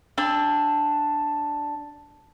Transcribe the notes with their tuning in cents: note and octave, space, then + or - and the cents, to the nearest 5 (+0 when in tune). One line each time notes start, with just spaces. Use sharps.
D4 +0 G5 +30 E6 +0